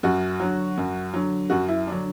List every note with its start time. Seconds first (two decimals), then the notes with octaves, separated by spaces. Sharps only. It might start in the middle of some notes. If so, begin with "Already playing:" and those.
0.03 F#2 F#4
0.40 D3 F#3
0.78 F#2
1.14 D3 F#3
1.50 F#2 F#4
1.68 E4
1.87 D3 F#3 D4